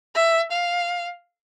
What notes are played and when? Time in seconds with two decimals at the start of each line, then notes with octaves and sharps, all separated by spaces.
0.15 E5
0.52 F5